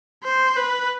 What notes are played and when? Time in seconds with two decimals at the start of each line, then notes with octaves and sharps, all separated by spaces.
0.24 C5
0.56 B4